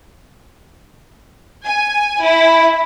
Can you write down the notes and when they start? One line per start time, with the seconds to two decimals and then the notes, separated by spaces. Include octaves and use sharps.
1.66 G#5
2.24 E4